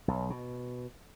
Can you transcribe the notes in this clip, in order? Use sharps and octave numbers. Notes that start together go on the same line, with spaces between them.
B1
B2